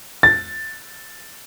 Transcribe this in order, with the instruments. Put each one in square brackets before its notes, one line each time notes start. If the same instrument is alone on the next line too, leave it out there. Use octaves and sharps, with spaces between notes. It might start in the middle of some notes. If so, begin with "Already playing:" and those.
[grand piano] A6